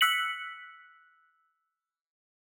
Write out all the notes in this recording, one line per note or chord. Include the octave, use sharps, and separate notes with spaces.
E6 F#6 B6 C#7 F#7